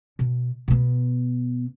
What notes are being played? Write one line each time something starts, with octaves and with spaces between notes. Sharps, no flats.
B2
B2 B3